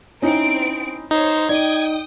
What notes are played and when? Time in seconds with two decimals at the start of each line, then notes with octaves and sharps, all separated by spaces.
0.22 C4 C#4 D#4 E4 D7
1.11 D#4 C5 C#5
1.49 D#4 D5 G5 D#6 G#6